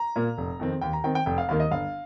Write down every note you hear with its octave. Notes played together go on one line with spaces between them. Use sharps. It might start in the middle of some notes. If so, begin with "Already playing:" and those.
Already playing: A#5
A#2 A#3
F1
F2 D#3 C4
D#2 G5
A#5
D#3 C4 G5
G5
F1 G5
F5
D#2 D#3 A#3 F5
D#5
G1 F5